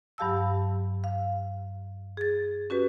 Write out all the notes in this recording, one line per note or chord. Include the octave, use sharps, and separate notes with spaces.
G2 F#3 G4 F5 A5 E6
F5
G#4 A6
C#4 F#4 G4 B4